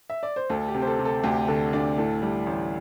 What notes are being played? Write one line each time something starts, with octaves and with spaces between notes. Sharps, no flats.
E5
D5
C5
D2 A4
G4
C3
C5
A4
C3
A4
D2 G4
D3 A4
D2 D4 D5
A2 A4
G3
A1